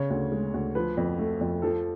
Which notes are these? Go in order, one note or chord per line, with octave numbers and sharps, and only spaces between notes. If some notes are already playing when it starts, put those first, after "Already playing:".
Already playing: C#3 C#5
D2
G#3
D2
F3 B4
F2
A3
F2
F3 A4